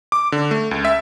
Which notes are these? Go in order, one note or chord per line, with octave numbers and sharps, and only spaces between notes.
D6
D3
A3
C#2
E5